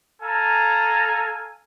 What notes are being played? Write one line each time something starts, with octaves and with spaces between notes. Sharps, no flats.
A4 F5 G#5 A#5